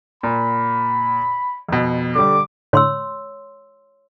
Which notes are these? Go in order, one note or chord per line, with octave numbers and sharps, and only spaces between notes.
A#2 B5
F2 B2
D3 G3 D6
A2 D3 C#5 C6 E6